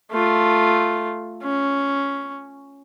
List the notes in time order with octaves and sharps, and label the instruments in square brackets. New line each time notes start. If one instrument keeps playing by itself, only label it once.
[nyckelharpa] A3 F4
C#4